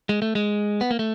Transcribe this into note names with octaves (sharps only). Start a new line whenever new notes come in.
G#3
A3
G#3
B3
A#3
A3